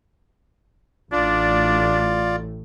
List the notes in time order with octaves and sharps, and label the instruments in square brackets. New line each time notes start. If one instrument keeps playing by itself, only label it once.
[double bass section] A1 A2 [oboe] D4 [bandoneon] F4 D5